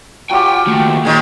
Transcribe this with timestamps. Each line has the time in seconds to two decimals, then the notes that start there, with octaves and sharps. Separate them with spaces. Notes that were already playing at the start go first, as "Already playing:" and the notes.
0.31 F#3 F4 G4 G5 G#5
0.67 D#2 A3
1.05 D#2 A#2 D#3 G#3